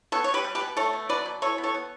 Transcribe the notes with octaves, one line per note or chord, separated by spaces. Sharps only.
B3 A4 C#5
B2 C#5
G4 B4
G3
G4 B4
B2
A3 A4 C#5
B2
F#3 B4 D5
B2
E3 A4 C#5
B3
A4 C#5
B3